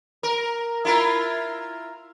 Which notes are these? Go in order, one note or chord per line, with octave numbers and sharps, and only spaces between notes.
A#4
E4 F4 A#4